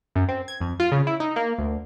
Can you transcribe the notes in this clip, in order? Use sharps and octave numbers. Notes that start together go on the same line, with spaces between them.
F#2
C4
G#6
F2
F4
C#3
E4
D#4
A#3
D2